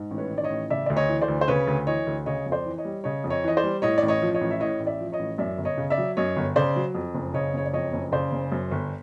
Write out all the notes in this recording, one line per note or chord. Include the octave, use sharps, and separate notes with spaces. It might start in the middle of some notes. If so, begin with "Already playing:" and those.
Already playing: G#2
A1
B4 C#5
D#3
D5
C#5 D#5
A1
C#3 D5 E5
D2 D5
C#5 D#5
E3
C5 D5
D2
C5
C#3 B4 C#5
D2
E3 C#5 D#5
D2
C#3 C#5 D#5
F2
C5 D5
E3
C#5 D#5
G3
C#3 C#5 D#5
F2
C#5 D#5
E3 D#5
C5 D5
G3
A2 C#5 D#5
A1 D5
C#5 D#5
F3
C#5 D#5
A1
E5
A2 C#5 D#5
A1
D5 E5
F3
C#5 D#5
A1
F#2 D5 E5
G1
C#5 D#5
C#3
D5 E5
F#3
F#2 C#5 D#5
G1
C#3 C5 D5
F#3
F2
F#1
C#3 C#5 D#5
F#1 C#5
D5
F2 C#5 D#5
F#1
C#3 C5 D5
F#1
F#2
G1